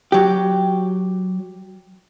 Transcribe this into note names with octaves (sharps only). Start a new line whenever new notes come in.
F#3 G4